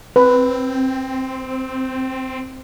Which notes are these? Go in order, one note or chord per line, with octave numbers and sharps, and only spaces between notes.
C4 B4